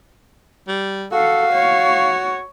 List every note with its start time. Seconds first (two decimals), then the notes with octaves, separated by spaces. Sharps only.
0.68 G3
1.12 F#4 A4 F5
1.53 C#5